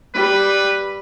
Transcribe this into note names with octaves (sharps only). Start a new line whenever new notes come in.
G3 B4